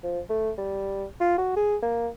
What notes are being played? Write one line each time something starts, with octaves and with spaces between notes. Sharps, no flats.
F3
A3
G3
F4
F#4
G#4
A#3